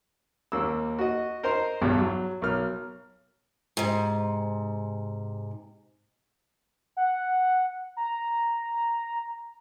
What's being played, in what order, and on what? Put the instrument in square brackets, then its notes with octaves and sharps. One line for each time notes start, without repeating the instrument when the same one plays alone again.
[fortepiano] D#2 A#3 E6
F#4 D#5
A#4 C5 D#5 A#5 C6
B1 E2 G2 G3
F#3
B1 A#4 F6
[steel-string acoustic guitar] G#2 C3
[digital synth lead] F#5
A#5